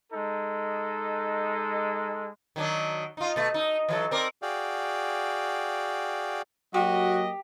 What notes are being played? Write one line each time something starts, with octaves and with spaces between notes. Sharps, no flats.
G#3 D#4 A4
D#3 F#3 D4
D#4 F4
B2 A3
D#4
E3 F#3 A4
C4 A#4 D5
F#4 G#4 D5 F5 G5
F#3 A#3 F#4 G4 D#5